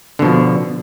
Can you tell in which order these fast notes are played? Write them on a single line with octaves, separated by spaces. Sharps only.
D3 B2 F3